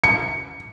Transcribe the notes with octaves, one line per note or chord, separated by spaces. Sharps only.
C#7